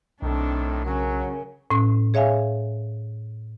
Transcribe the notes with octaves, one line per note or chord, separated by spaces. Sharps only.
B1 A2 D#3 A3 C4 D4 A4
C#3 F#3 A#4 C#5 G#5
A2 C#4 C6
G#4 C#5 E5 F5 G#5